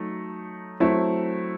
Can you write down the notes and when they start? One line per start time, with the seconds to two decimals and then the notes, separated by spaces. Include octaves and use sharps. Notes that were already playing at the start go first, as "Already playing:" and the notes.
Already playing: F#3 A3 D#4
0.80 F#3 A3 C4 E4